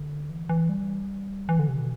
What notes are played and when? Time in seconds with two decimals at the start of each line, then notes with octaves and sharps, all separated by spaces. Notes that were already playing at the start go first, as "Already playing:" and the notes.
Already playing: D3
0.30 E3
0.49 E3
0.69 G3
1.49 E3
1.59 D3
1.68 C3
1.79 B2